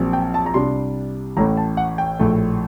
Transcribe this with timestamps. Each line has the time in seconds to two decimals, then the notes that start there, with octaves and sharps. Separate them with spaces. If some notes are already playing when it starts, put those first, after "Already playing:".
Already playing: A#1 A#2 F#3 C4
0.13 G5
0.34 A5
0.46 A#5
0.54 C2 C3 G3 D4 C6
1.37 A1 A2 A3 A#5
1.57 A5
1.77 F#5
1.98 G5
2.19 A#1 A2 A3